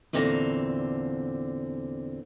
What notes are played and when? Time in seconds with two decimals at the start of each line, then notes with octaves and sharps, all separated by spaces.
0.13 E2 A#2 D3 C4 F4 A#5